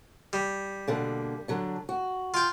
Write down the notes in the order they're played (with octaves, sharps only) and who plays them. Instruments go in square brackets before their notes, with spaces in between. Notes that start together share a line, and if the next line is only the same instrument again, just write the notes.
[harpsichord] G3
[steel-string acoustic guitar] B2 D3 A#3
D3 F#3 D4
F#4
[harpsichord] F4 G5